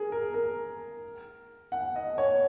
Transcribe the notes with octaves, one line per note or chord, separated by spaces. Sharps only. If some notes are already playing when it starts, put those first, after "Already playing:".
Already playing: G#4 A#4
A#4
A#4
F#5
D#5
C#5